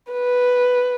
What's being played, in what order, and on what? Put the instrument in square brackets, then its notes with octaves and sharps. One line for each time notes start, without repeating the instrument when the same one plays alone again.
[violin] B4